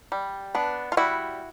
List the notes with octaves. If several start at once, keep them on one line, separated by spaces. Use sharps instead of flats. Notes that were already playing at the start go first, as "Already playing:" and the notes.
G3
B3 D4
F4
G3 E4 F#4